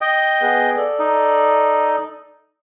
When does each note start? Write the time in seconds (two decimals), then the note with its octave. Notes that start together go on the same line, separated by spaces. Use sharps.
0.01 D#5 G5
0.42 B3 G#4 B4
0.76 A4 D5
0.99 D#4